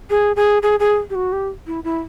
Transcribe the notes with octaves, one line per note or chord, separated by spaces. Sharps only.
G#4
G#4
G#4
G#4
G4
F#4
G4
E4
E4